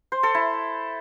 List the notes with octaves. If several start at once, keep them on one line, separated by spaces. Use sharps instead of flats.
C5
A4
E4